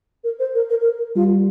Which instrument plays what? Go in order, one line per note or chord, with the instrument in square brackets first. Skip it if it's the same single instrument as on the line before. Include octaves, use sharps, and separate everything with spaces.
[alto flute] A#4
C5
A#4
A#4
A#4
[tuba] G3 [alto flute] F4